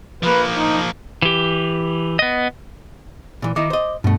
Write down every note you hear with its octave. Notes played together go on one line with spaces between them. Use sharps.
F3 A#3 B4
D#4
E3 G4
B3 D#5
A#2 E3
D#3 D#4 E4 D6
C5 D#5
G2 B2 A3